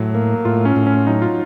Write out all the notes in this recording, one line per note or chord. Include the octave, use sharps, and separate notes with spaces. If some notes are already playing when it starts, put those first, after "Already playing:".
Already playing: A2 F#3
A#3
A2 F4
C#4
A2
C#4
F#3 D#4
F4